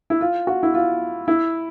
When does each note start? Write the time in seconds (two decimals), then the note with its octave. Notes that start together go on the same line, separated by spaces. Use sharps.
0.10 E4
0.21 F4
0.47 F#4
0.63 E4
0.74 F4
1.28 E4